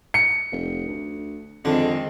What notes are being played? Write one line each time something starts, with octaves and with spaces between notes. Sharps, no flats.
C#7
F1
D2
F2 D3 D#3 G#3 C4 D4